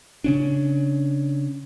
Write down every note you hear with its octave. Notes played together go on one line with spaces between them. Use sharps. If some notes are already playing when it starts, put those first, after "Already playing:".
C#3 C#4 D4